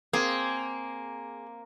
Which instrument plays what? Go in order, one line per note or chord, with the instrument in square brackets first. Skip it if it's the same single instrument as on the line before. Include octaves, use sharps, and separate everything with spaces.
[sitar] A#3 [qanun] C4 [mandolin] G#4